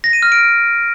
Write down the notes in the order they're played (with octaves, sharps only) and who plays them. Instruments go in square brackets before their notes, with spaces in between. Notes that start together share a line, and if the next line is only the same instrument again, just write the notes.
[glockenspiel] A#6
D#7
F6
D7